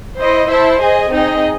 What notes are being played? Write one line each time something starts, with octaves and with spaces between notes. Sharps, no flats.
E4 C5 D#5
E4 C5 E5 A5
G#4 D#5 G#5
C4 D#4 G#4 D#5